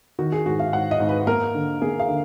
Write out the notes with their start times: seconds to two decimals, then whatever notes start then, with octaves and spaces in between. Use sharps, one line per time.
0.19 D#3 F#4
0.32 G#4
0.46 G#2 F#4
0.59 F5
0.73 G#2 F#5
0.91 D#5
1.00 G#2
1.09 B4
1.27 A#3 A#4
1.55 D3
1.82 A#3 G#4
2.00 F5
2.09 D3